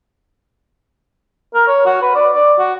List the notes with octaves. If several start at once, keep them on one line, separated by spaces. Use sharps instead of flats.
A#4
C#5
F#4
B4
D5
D5
F#4